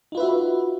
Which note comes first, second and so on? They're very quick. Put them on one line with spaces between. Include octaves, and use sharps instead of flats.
D#4 F4 B4 E5 F#4